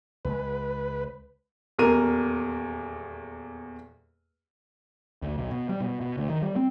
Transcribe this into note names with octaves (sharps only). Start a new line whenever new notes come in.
C#2 G#3 B4
D#1 E2 A#4 D#7
D2
B1
B2
G3
B2
B2
D2
D#3
G3
C4